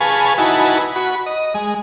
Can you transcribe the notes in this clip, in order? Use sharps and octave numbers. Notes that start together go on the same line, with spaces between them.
G#4 B4 F5 G#5 A5 C#6
D#4 E4 F#4 B4 G#5 A5
F#4 B5
D#5
G#3